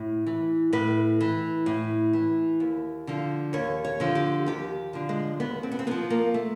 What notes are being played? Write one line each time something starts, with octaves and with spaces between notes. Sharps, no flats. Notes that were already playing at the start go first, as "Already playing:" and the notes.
Already playing: A2
E3
A2 B4
E3
A2
E3
D#2
D3 F3
D#2 C#5
C#5
D3 F3
G4
D#2 G4
D3 F3
G#3
D#2 B3
C4
B3
C4
D3 F3 B3
A#3
A3